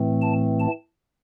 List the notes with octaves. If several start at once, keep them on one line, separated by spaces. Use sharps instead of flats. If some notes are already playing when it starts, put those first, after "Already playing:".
Already playing: A2 E3 A3 C4
A5
A5